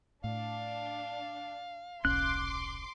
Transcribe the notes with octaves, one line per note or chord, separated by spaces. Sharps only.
A2 D4 F5
D#1 B1 C#4 C6 D6 F#6